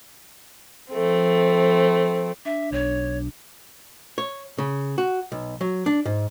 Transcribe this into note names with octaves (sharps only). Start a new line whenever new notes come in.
F3 A3 C4
D4 E5
B1 C#5
C#5
C#3
F#4
B1
F#3
D4
G#2